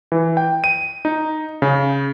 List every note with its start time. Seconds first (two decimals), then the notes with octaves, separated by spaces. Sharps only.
0.12 E3
0.37 G5
0.64 D#7
1.05 D#4
1.62 C#3